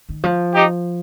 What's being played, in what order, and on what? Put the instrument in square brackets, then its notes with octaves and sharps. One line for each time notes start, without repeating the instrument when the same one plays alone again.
[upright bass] D#3
F3
[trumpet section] D#4 G4